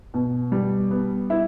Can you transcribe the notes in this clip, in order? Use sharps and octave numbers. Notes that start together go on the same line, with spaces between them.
B2
G3
B3
E4